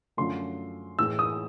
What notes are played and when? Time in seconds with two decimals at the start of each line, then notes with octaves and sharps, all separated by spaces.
0.17 F#2 D3 F3 A3 C6
0.99 A2 E3 G#3 E6
1.19 D#6